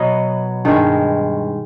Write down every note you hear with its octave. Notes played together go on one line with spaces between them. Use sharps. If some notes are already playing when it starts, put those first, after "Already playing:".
Already playing: B2 F#3 B3 D#5
G2 D#3 G#3